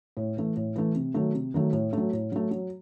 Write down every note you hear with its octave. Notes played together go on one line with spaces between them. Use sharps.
A2
E3 A3
A2
E3 A3
C3
D#3 F#3 A3
C3
D#3 F#3 A3
A2
F#3 A3
A2
F#3 A3
F#3